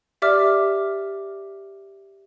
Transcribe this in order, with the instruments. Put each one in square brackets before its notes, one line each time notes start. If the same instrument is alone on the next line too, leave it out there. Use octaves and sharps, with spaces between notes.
[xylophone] G4 D5 E5 D6 F6